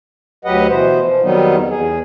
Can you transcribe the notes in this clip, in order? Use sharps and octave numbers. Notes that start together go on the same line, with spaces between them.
D2 F#3 G4 B4 D#5 F#5
B2 E3 C5
F3
F2 D#3 F#3 G3 B3 D#4
E2 G#4